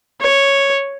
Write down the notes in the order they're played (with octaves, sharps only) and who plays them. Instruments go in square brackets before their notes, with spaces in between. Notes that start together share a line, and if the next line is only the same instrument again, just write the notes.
[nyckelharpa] C#5